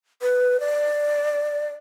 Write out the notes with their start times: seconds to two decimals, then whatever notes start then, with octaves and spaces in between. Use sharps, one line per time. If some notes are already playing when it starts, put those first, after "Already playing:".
0.22 B4
0.60 D5